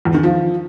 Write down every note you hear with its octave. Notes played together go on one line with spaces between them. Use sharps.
E2
D#3
F3